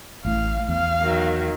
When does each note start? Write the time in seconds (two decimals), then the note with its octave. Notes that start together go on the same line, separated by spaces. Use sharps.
0.25 A1 A2 F5
0.69 E2 F5
1.02 D#3 F#3